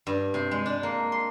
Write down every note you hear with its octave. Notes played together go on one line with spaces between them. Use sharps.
G2
C3
G#3
D4
A#3
C6